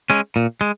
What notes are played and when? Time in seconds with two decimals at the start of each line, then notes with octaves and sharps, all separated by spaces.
0.10 G#3 C#4
0.36 A#2
0.61 G#3